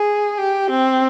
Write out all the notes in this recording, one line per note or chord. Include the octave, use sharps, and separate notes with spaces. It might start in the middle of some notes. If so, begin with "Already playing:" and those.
Already playing: G#4
G4
C4